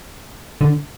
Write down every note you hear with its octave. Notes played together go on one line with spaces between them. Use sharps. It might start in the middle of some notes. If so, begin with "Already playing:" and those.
D3